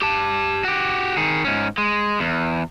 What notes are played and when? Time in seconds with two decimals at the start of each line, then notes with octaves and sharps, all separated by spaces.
0.02 G4 A5
0.64 F#4 G4
1.17 D#3 G#4
1.45 G#2 C#4
1.78 G#3
2.20 E2